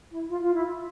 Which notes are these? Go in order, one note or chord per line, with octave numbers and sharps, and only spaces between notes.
E4
F4
F4
E4